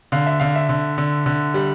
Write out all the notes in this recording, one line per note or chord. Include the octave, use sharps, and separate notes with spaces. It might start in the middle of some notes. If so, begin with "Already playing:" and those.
D3 F5
E5
D3 F5
E5
D3
D3
D3
G3